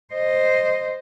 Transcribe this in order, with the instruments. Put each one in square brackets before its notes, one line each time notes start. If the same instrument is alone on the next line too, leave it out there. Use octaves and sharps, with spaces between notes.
[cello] C5 D#5